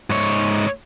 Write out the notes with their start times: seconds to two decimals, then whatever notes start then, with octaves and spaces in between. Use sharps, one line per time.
0.10 G#2 C#5